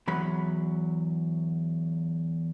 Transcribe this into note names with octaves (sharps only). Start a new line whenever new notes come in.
E2 F#3 B5